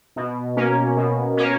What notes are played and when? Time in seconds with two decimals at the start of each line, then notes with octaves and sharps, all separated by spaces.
0.16 B2
0.56 A#3 C#4
0.97 B2
1.37 A#3 C#4